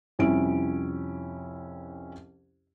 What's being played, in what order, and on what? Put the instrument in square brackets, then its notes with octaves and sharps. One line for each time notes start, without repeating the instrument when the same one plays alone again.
[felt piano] C2 F2 C#4 E4 E5 D7